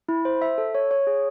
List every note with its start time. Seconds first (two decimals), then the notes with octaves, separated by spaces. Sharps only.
0.09 E4
0.25 C5
0.42 E5
0.58 A4
0.75 C#5
0.91 C#5
1.07 G#4